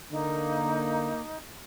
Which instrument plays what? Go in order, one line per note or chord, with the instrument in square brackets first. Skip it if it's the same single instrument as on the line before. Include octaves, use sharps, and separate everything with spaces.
[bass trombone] D3 [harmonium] A#3 [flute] D#4